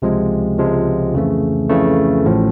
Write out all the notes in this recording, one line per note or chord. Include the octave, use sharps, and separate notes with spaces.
C#2 C3 F3 G#3
C#2 C3 F3 G#3
F2 C#3 E3 A3
F2 C#3 E3 A3
A1 A2 F3